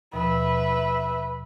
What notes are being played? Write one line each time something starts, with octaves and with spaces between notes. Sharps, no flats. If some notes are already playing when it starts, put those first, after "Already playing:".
D#2 B2 F3 B4 E5